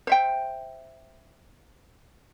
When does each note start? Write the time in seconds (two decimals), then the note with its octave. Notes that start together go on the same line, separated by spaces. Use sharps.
0.07 C5 E5 G5